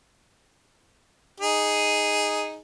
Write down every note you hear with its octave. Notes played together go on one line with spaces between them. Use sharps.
D#4 G#4